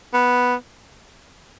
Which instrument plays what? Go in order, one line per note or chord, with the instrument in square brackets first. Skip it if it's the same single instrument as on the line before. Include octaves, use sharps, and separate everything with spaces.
[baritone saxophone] B3